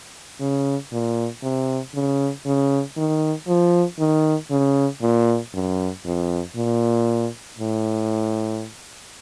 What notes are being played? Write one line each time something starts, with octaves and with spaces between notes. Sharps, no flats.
C#3
A#2
C3
C#3
C#3
D#3
F3
D#3
C#3
A#2
F#2
F2
A#2
A2